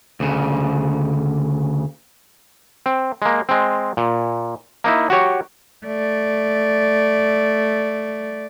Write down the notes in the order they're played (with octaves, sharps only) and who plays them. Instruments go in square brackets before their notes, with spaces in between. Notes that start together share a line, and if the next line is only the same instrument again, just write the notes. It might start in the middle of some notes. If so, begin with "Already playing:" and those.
[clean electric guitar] D2 C#3
[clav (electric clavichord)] C4
G#3 A#3
G#3 C4
A#2
A#3 D#4 E4
F#4 G4 C#5
[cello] A3 D5